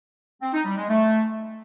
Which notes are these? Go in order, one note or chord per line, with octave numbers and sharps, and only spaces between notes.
C4
D#4
G3
G#3
A3